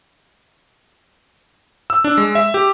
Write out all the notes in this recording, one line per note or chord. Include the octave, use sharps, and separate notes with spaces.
E6
D4
G#3
E5
G4